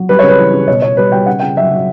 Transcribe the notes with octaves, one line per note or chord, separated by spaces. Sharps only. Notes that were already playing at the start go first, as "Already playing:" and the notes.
Already playing: F#3
G3 B4
C#3 C#5
B4
E3
C#3
B2 C#5
B2 C#5
G3 B4
G3 G5
C#3 F#5
C#3 G5
F#3 E5
F#3